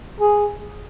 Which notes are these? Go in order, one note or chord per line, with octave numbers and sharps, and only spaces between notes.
G#4